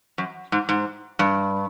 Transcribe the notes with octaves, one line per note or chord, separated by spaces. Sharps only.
F#2
G#2
G#2
G2